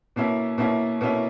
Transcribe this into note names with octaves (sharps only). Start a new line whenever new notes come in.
B2 A#3 C#4 E4
B2 A#3 C#4 E4
B2 A#3 C#4 E4